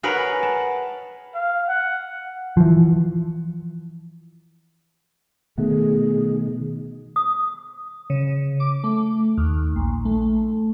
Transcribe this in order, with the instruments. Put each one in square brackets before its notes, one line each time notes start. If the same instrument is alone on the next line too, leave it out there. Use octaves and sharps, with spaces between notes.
[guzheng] G#4 A#4 B4 C#5 F#5
A5
[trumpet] F5
F#5
[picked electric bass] E3 F3
[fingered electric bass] B2 [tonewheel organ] D#3 [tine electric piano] A3 [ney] G#4
[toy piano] D#6
[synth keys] C#3
D6
A3
D#2
A#1
A3